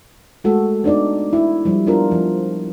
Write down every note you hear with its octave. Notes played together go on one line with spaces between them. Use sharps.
G#3 A3 F#4 A4
B3 D4 D#4 D5
E4
F3 G3
B3 D4 F4 A#4
F3